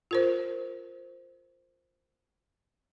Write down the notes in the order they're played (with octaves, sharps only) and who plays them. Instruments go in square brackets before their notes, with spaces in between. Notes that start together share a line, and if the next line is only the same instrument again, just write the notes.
[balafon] F4 A#4 C5